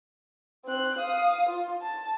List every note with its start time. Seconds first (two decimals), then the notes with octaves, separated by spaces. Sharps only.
0.66 C4 F#6
0.98 F5 D#6
1.49 F4
1.82 A5